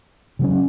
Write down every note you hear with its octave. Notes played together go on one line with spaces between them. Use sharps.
C#3 F#3 C#4